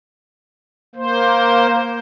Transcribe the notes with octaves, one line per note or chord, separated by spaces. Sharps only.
A#3 C5